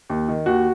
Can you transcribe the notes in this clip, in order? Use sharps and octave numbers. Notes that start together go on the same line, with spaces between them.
D#2
D#3
D#2 F#4